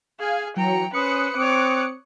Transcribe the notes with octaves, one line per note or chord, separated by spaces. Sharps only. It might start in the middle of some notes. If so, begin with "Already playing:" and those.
G#4 F5 G#5
E3 F#3 G5 A#5 C#7
C#4 B4 C5 D#6 F#6 C#7
C4 C#5 D6